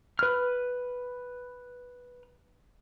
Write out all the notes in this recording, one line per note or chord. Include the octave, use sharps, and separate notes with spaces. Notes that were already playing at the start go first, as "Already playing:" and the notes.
B4 F6